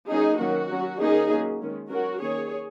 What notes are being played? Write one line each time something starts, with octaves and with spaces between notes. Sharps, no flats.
F#3 A#3 C#4 D#4 G#4
D#3 F#3 A#3 C#4 F#4
F#3 C#4
D#3 A#3 C#4 D#4 G#4
F#3 A#3 C#4
D#3 G#3 C#4
F#3 C#4 F#4 A#4
D#3 A#3 C#4 G#4 C#5